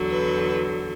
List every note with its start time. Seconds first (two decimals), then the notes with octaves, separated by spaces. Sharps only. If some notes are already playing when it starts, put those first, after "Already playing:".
Already playing: E2 D3 F#3
0.10 B4